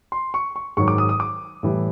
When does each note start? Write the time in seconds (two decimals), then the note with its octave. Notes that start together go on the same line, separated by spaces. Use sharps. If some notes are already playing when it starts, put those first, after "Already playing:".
0.12 C6
0.34 C#6
0.56 C#6
0.77 G#2 D#3 F#3 C#6
0.88 D6
0.98 D#6
1.09 D#6
1.20 D6
1.63 A2 E3 G3